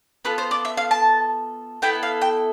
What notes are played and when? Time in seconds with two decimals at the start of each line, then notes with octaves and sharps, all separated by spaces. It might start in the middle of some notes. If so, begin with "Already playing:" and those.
0.25 B3 F4 A4 B4
0.38 C5
0.51 D5
0.65 E5
0.77 F5
0.91 A5
1.82 B3 E4 A4 G5
2.03 F5
2.21 G5